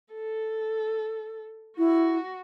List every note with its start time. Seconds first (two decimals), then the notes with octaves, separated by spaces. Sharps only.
0.14 A4
1.78 E4 F#4